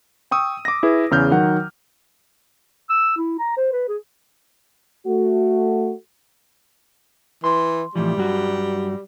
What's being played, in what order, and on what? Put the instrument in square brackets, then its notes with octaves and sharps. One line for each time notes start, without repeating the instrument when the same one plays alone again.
[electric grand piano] G5 C#6 D#6 E6
D6 A#6
E4 G#4 B4
E2 C#3 F6 G6
D#3 F#3 F#5
[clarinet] E6
E4
A#5
C5
B4
G#4
[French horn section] A3 F#4
[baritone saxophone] E3 [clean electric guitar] C6
[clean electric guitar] A2 E3 F3 [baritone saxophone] G3
[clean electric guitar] G2 F#3 F#4